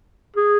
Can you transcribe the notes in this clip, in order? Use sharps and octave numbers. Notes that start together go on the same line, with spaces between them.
G#4